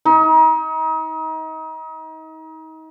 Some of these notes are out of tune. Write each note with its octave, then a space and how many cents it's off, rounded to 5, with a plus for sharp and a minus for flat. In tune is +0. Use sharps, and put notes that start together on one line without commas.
D#4 +35